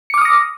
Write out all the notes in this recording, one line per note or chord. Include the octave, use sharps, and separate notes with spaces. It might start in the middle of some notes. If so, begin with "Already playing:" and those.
D6 D#6 F6 A#6 C#7